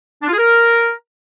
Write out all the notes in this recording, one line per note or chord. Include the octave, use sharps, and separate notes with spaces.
D4
F4
G#4
A#4